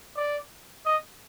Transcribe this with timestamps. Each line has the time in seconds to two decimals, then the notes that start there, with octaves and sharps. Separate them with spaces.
0.17 D5
0.86 D#5